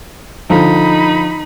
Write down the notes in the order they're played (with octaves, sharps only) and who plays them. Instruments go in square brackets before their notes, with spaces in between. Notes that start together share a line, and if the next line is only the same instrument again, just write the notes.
[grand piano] D3 F3 [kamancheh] D#4 B5